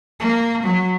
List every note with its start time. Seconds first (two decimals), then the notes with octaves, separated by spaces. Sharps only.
0.20 A#3
0.62 F#3